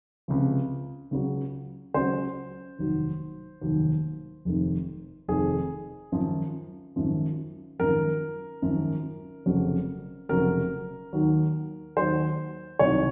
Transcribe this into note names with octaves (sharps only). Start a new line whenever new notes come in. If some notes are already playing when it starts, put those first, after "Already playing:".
C#2 C3 F3
C#2 C#3 F#3
C#2 C#3 F#3 C5
F1 D#2 D#3 F#3
F1 D#2 D#3 F#3
F1 F2 D#3
F1 F2 D#3 G#4
G#1 F#2 F3
G#1 F#2 F3
G#1 F#2 F3 A#4
G#1 F#2 F3
F1 F2 C#3 F#3
F1 F2 C#3 F#3 A#4
D#2 D#3 F#3
D#2 D#3 F#3 C5
C2 C3 D#3 F#3 C#5